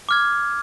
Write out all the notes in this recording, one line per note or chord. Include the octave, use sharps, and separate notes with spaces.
D6 F6 G#6